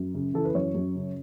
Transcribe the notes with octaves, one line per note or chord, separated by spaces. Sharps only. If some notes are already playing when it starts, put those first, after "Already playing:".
Already playing: F#2
C#3
E3 A4
B4
F#2 C#5
F#2
C#3